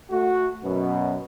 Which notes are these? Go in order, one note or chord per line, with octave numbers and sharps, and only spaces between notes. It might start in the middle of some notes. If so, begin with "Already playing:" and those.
A3 F#4
F#2 B2